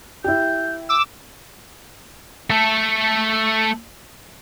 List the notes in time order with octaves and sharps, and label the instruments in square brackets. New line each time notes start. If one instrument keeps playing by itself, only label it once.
[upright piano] E4 G4 [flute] G6
[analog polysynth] D6 E6
[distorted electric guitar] A3 A4